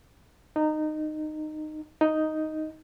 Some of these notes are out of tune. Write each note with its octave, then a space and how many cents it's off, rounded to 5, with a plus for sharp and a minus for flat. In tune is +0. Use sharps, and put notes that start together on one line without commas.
D#4 -20
D#4 +0